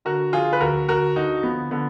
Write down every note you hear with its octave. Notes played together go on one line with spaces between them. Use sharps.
D3 F#4 A#4
F3 F4 G#4
B4
D2 F#4 A#4
D2 F#4 A#4
D3 D#4 F#4
F3 B3
D3 B3